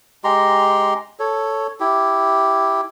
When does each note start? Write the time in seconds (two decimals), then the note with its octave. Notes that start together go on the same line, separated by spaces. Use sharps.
0.24 G#3 G4 A#5 C6
1.20 A4 C#5
1.80 E4 G4